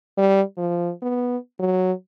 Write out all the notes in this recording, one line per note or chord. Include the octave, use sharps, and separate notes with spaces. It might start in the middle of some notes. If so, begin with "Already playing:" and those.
G3
F3
B3
F#3